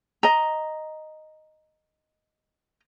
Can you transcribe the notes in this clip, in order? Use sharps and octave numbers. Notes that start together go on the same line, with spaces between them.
D#5 A#5